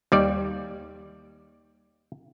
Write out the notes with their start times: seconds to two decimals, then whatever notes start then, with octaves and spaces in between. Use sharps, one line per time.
0.12 D#2 G3 D5